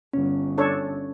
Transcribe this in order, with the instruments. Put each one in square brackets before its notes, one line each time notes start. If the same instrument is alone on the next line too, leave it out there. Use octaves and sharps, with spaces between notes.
[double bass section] G1 [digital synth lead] C#4
[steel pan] D4 A4 C#5